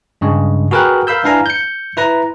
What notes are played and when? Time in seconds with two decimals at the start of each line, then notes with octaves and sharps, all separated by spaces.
0.21 G2 C#3 G#3
0.71 F#4 G#4 A#4 B4 G5 F#6
1.07 A#4 F5 B5 E6 G6
1.24 D4 E4 B4 F5 G#5 A#5
1.46 G6 C#7
1.97 E4 B4 A#5